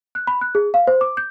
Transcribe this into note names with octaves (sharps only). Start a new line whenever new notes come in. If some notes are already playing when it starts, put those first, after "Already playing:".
F#6
B5
F#6
G#4
F5
C5
D6
G6